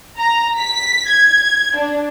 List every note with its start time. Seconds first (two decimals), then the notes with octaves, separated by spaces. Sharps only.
0.19 A#5
0.58 B6
1.09 G#6
1.75 D4